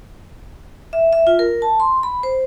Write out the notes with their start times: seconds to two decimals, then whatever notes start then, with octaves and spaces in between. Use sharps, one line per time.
0.93 E5
1.13 E5
1.27 F4
1.39 A#4
1.62 A5
1.80 C6
2.03 B5
2.23 C5